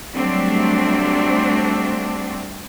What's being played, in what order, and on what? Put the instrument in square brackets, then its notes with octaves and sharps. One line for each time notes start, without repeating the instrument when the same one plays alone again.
[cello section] F#3 G3 A3 C4 D4